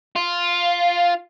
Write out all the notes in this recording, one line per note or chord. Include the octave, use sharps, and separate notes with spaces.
F4